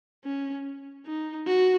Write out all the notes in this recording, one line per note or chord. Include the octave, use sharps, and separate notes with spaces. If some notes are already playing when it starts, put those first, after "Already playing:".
C#4
D#4
F#4